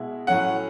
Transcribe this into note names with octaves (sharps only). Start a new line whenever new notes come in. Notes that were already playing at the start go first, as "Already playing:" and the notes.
Already playing: B2 G#3 E4
A2 F#3 A3 C#4 F#5